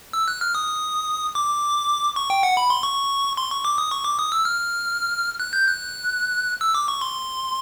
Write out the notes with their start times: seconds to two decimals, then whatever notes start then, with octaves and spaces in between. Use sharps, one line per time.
0.13 E6
0.28 F#6
0.41 F6
0.55 D#6
1.35 D6
2.16 C#6
2.30 G5
2.43 F#5
2.57 B5
2.70 C6
2.83 C#6
3.37 C6
3.51 C#6
3.65 D6
3.78 D#6
3.91 C#6
4.05 D6
4.19 D#6
4.32 E6
4.45 F6
5.40 F#6
5.53 G6
5.67 F#6
6.61 E6
6.75 D6
6.88 C#6
7.01 C6